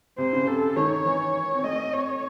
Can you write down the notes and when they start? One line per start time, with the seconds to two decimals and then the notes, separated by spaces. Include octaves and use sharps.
0.18 C3 C5
0.33 C#3
0.47 C3 A4
0.76 D#3 C#5
1.06 E3
1.54 C4
1.64 A3 D#5
1.93 C4 C#5